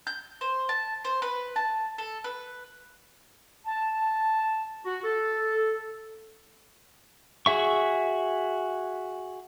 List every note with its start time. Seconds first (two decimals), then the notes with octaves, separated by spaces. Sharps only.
0.07 G6
0.41 C5
0.69 A5
1.05 C5
1.22 B4
1.56 A5
1.98 A4
2.24 B4
3.66 A5
4.85 F#4
5.04 A4
7.46 F#4 G#4 E5 C#6